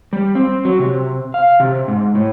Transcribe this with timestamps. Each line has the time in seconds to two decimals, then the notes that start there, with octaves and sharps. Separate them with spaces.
0.13 G3
0.35 C4
0.65 F#3
0.79 C3
1.34 F5
1.60 C3
1.88 G#2
2.15 A2